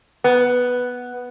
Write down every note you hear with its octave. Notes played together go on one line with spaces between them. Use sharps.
B3